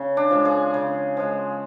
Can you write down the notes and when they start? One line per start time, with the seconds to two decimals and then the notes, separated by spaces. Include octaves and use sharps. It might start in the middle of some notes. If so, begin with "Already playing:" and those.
Already playing: C#3
0.17 D4
0.31 F3 G#3
0.45 G#4
0.74 C#3
1.17 F3 G#3